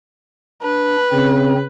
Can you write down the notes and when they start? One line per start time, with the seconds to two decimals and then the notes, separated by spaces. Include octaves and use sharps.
0.63 D4 B4
1.12 C#3 C4